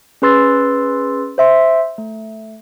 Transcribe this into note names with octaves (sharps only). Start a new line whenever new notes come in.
C#4 G#4 B4 C6 E6 A6
C5 E5 C6
A3